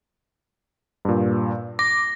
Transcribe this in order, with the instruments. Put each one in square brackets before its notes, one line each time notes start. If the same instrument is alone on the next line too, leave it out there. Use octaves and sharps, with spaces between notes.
[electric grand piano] G2 A#2
[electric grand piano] D6 [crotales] A#6